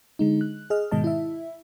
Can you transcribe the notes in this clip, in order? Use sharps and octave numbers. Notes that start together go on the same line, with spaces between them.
D3 G#3 D#4
F#6
G#4 D#5 F6
G#2 B2 D#3 G#3 D#5 A5
E4 E5